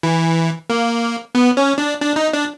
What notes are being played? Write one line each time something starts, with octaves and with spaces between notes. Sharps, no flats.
E3
A#3
B3
C#4
D4
D4
D#4
D4